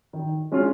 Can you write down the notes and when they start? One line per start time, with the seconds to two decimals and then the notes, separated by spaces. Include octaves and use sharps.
0.13 D#3
0.52 G#3 C#4 F4